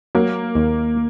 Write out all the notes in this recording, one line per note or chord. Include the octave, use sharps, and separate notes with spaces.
F#3 A#3
D#2